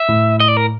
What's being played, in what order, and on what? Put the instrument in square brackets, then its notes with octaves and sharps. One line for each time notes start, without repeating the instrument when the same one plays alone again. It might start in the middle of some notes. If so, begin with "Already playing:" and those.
Already playing: [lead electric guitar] E5
[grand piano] A2
[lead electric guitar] D#5
D5
A#4